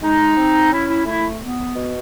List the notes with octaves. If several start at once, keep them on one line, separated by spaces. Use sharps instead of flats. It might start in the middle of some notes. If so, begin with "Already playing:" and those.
G#3 D#4
C4
C#4 E4
E4
A3 E4
B3
B2